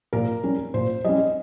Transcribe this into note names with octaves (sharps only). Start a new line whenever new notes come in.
A#2 A#4
G3 C#4
A#2 C5
G3 C#4 D#5